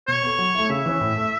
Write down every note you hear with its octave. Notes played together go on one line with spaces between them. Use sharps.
B2 C#5
B3 A4
F#3
A3 E4
C#3 E5
E3 C#4
A2
A3 E4